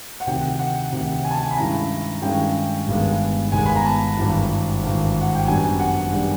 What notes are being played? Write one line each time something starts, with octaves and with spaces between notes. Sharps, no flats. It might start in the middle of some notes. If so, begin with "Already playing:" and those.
F#5
D2 C3 D#3 G5
F#5
D2 C3 D#3
G#5
A5
G#5
B5
G2 D#3 G#3 C#4 E4 A#5
G2 D#3 G#3 C#4 E4 G5
G1 G2 D#3 G#3 B3
G1 G2 D#3 G#3 B3 G#5
B5
A#5
A5
G#1 G2 E3
G#1 G2 E3
F#5
G5
F#2 D#3 G3 B3 D4 G#5
F#5
D#3 G3 B3 D4 F#5